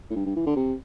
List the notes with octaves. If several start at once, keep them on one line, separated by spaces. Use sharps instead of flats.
A2
G2
G2
E3
D3
C3